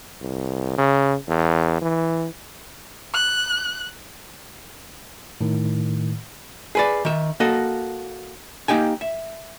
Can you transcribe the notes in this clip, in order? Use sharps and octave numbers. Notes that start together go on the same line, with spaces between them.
C2
C#3
E2
E3
F#6
A2 D#3
G#4 B4 D5
D#3 E5
A#3 F#4 A4 D#5
A#3 D#4 G4 G5 G#5
E5